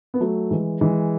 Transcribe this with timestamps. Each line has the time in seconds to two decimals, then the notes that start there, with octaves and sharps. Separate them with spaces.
0.14 B3
0.21 F#3 A3
0.51 E3 G#3
0.81 E3 G#3